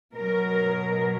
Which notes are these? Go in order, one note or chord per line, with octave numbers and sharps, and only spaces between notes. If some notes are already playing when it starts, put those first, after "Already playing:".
B2 F#3 A#4